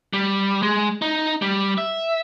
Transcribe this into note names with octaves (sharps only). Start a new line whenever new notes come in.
G3
G#3
D#4
G3
E5